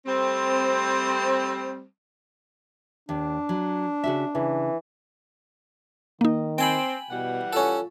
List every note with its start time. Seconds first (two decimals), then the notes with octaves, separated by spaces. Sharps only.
0.05 G3 A3 C4
3.09 D#2 D4
3.49 F#3
4.04 C#3 F#4 E5
4.35 C#3 E3
6.21 D#3 A#3 D#4
6.58 C4 G5 G#5 B5
7.11 B2 E3 G3 F#5
7.53 C#4 F4 A4